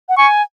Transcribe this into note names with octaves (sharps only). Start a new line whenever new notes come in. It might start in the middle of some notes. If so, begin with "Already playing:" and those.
F#5
G#5 C#6